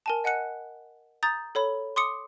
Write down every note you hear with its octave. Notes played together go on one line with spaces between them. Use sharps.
A#4 G#5 A5
D#5 F#5 G#5 F#6 C#7
A#5 D#6 G6 A6
A4 C#5 B5
C6 D6 D#6 C#7